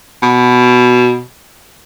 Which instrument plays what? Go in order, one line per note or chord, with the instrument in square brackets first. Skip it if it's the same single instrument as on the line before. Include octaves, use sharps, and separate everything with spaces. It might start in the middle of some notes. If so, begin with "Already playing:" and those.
[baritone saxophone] B2